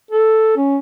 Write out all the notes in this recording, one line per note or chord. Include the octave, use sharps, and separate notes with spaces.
A4
C#4